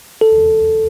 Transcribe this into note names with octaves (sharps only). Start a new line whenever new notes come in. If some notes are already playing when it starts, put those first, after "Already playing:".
A4